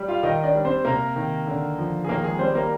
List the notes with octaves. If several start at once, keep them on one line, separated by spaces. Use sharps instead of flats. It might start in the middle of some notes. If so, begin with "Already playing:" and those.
Already playing: G3
F4 F5
D#3 D#4 D#5
D4 D5
G3
C4 C5
C3 A#3 A#4
D#3
D3
F3
G#4
D#3 A#3 A#4
G#3 G#4
G3 C4 C5
A#3 A#4